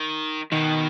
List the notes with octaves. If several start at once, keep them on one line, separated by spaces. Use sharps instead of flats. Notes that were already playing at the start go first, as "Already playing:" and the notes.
Already playing: D#3
B2 D#3